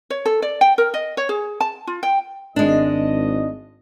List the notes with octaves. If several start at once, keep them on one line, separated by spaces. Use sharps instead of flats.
C#5
A4
D5
G5
A#4
D#5
C#5
G#4
A5
F4
G5
G#1 G#3 D4 D#5